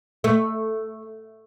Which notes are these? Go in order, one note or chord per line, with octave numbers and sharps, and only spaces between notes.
A3